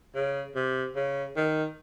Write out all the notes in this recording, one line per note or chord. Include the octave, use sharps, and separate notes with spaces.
C#3
C3
C#3
D#3